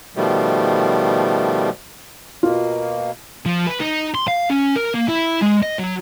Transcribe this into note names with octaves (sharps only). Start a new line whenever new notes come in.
B2 D#3 F3 G3 A3
B2 A#3 F4 F#4
F3
B4
D#4
C6
F5
C#4
A#4
A#3
E4
G#3
D#5
F#3